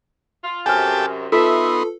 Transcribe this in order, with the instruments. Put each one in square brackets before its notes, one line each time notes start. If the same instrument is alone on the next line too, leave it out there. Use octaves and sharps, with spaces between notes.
[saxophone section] F4
[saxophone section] F#2 C3 [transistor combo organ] G4 A4 [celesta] G#5 F6
[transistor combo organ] B3 D#4 C6 [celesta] F4 B4 [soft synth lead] A4 [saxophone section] E5